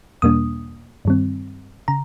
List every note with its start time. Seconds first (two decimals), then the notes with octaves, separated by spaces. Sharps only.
0.22 E2 B2 G3 A#3 D4 D#6
1.05 G2 D#3 G3 C4
1.88 C#3 A#5